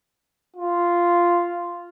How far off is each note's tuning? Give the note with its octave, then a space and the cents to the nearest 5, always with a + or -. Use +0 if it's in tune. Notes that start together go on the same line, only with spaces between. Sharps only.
F4 -5